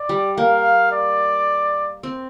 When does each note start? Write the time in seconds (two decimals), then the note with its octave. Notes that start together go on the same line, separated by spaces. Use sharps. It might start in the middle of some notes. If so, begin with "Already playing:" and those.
Already playing: D5
0.09 G3
0.37 A#3 F5
0.92 D5
2.03 C4